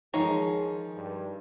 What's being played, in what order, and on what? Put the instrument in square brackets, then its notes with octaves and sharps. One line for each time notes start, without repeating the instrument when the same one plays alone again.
[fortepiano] D#3 F3 [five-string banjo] G#3 D#4 C#5 [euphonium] G#4
[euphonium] G2